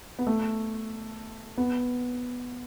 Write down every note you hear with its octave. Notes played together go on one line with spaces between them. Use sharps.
B3
A3
B3